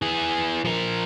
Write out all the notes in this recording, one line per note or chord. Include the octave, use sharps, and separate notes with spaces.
E3 G#4
F3 A#4